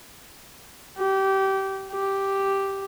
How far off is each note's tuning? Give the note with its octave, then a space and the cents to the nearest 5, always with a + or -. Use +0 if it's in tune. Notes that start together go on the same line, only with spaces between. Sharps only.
G4 -25
G4 -5